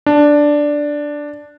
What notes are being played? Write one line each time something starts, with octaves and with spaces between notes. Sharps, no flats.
D4